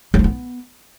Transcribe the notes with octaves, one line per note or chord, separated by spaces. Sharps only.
F#3
F3
B3